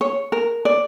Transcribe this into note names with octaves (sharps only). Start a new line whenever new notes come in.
C#5
A#4
D5